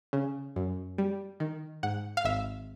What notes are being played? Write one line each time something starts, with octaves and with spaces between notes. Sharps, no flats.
C#3
F#2
G3
D#3
G#2 F#5
F5
G#1 E5